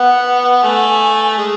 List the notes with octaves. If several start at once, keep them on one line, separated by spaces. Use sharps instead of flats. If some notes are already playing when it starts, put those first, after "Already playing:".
Already playing: B3 F#5
A3 G#5
G#3